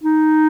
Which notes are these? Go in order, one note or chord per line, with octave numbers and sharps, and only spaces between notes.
D#4